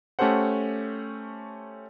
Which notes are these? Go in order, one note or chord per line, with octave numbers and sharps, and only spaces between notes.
A3 C#4 G4 A4 C5 F#5